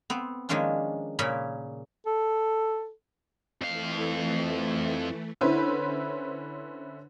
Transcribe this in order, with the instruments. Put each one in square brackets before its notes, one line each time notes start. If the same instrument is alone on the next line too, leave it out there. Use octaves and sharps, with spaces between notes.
[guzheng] B3 C4
D#3 F3 G#3 A#3 C#4 D4
A#2 C#3 A#3 C#4 B5
[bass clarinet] A4
[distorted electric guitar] F2 F5 [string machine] E3 A3
[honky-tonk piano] D3 C#4 E4 B4 C5